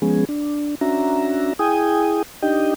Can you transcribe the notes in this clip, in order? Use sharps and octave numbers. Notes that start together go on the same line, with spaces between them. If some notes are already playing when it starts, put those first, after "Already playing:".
F3 G#3 B3 C#4 G#4
D4
C#4 D4 F#4 E5 A#5
E4 G#4 G5 G#5 D#6
D4 D#4 G4 D#5 G5